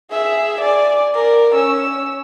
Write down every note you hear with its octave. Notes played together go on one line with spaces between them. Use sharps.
G#4 E5
D5 G#5
A#4 D5
C#4 E6